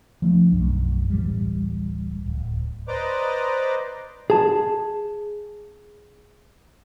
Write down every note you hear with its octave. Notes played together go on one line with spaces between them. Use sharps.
F3 A3 D4
B1 F#2
D1 A1 G3
D1
B4 C5 D5 D#5 A#5 D6
G#4 A5